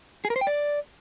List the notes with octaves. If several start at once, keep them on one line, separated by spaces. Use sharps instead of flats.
G#4
A#4
C5
G5
D5